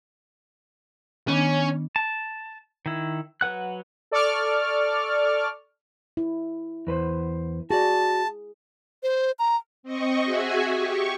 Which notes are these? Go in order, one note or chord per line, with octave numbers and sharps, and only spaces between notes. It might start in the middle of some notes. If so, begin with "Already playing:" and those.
D#3 B3 C#4 D4
A5
D#3 E4
F#3 B4 F#5 F#6
A4 D5 C#6 D6 F6
E4
E2 B4 C5
F#4 G#4 D5 A5
C5
A#5
C4 D#5 C#6
F#4 G#4 E5 G#5
G4 C#6